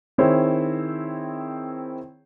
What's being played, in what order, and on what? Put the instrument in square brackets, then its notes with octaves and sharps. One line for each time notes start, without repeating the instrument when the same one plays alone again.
[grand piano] D#3 C4 E4 G#4 C5 C#5